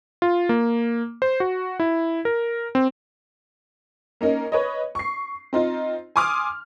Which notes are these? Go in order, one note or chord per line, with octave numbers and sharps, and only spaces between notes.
F4
A#3
C5
F#4
E4
A#4
C4
A#3 C#4 D#4 A#4
B4 C#5 D#5
C#6 C7
C4 D#4 F4
G#5 C6 D6 D#6 F6